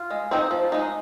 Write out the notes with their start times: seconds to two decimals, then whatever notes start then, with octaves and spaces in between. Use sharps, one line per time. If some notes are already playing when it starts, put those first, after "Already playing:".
Already playing: F4
0.11 G#3
0.31 C4 D#4
0.51 F3
0.72 G#3 D#4